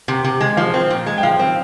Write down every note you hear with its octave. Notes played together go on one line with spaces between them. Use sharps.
C3
C3
G#3
F3 F5
C4
A#2
G#3
G5
F3 F5
C4